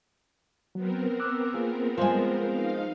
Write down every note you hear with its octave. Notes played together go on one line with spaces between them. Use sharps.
F#3 B3 C4 A#4
D6 E6 F#6
A#3 F4 G#4
F3 G#3 F4 C5
D#4 F5